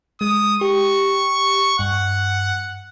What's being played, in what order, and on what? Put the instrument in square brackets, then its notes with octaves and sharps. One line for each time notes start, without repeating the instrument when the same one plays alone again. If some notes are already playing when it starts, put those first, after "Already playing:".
[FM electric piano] G#3 [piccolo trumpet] D#6
[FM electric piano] G4 [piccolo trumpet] C#6
[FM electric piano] G2 [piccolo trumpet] F#5